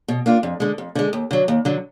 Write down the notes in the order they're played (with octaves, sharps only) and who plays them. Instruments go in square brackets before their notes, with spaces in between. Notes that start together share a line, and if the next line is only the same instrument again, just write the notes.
[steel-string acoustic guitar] B2
A#3 D4 F4
F2
D3 G#3
F2
D3 G#3
D#2
D3 F#3
D#2
D3 F#3